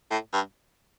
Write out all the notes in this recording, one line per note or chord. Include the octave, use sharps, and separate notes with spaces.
A2
G2